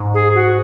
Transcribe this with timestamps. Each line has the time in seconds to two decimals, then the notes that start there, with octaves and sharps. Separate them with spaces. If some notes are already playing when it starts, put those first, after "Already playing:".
Already playing: G#2
0.14 G#4
0.35 F#4